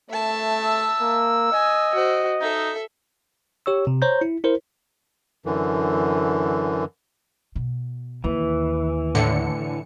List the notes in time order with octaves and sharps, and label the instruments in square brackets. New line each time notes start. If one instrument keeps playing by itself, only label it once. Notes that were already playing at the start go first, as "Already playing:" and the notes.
[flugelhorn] A3 [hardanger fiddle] E5 A5
[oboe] E6
[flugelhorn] A#3
[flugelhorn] D#5 [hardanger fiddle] G#5
[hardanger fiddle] F#4 C5
[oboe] D#4 [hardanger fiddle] A4 E5
[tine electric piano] G4 C#5 C#6 E6
C3
C5 C#5 A#5 G6
E4
E4 A#4 C5
[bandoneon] F#2 D3 E3
[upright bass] B2
[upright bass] D#2 [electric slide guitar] E3
[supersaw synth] A2 D3 C#7